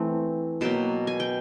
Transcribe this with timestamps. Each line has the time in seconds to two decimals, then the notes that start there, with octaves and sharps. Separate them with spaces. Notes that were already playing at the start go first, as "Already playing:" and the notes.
Already playing: E3 A3 C4
0.61 B2 F#3 A#3 G5 A5
1.07 G#5
1.20 G5